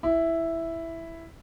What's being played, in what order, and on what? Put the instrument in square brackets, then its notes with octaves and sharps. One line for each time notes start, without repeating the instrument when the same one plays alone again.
[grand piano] E4